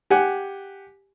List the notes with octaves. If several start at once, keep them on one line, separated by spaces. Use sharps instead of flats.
G4 F#5 G#5